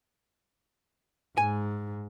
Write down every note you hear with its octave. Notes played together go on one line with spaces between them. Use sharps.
G#2 G#5